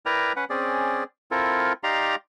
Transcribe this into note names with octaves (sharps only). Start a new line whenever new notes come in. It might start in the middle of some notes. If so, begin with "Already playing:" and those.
E4 A#4 B4 D5 G5 A#5
C#4 B4 F#5
C4 C#4 G#4 D5
C4 E4 F4 A4 A#4
D#4 G4 D5 F5 A#5 C6